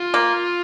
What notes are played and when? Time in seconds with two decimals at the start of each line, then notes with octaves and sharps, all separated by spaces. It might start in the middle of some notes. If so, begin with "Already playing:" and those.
Already playing: F4
0.14 A#3